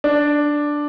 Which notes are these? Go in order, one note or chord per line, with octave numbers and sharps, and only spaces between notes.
D4